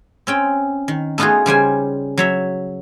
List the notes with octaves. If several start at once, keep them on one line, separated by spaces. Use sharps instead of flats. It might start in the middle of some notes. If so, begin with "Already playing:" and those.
C4 C#4 G5
D#3
A3 B3 D#4 F4 F#4 G#4
C#3 G3 C5 G#5
F#3 C#5 E5